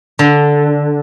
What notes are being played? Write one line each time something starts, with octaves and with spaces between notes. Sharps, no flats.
D3